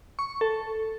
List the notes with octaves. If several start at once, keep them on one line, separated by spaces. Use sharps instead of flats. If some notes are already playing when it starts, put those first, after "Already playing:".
C#6
A4